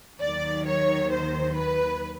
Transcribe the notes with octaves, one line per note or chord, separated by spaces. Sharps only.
D#2 D#3 F#3 D5
C#5
C5
B4